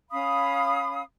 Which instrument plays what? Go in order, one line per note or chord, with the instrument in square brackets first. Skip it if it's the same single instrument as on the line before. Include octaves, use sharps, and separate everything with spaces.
[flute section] C#4 F5 B5 D#6